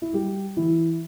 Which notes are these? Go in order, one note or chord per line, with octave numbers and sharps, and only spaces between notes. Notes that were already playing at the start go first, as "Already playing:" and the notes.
E4
G3 G4
E3 E4